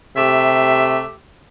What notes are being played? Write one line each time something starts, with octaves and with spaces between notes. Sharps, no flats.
C3 A3 G4 E5